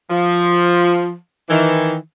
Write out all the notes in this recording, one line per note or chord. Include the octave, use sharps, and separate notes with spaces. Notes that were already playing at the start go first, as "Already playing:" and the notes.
F3
D#3 E3